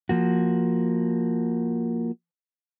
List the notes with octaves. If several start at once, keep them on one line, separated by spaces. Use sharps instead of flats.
F3 A#3 F#4